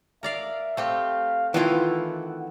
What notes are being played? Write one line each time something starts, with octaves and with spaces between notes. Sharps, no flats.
A#4 D5 E5 F5
A3 C4 G4 F5
D#3 E3 A3 E4 F4 F#5